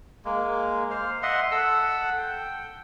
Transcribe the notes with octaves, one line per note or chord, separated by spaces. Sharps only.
G#3 A#3
C5 F5
D#5 E5 F#5 C6
A4 F#5 E6
G5